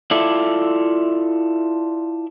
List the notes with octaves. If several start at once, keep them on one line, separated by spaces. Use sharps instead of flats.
E4 F4 A4 D5 E5